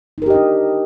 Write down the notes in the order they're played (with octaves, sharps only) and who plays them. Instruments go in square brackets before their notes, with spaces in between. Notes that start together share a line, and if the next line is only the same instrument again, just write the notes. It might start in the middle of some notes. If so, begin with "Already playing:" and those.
[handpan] D#4
A#4
G4
D#5
D4